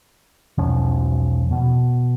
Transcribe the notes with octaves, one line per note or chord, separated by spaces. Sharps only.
E1 B1 F3 C#4
B2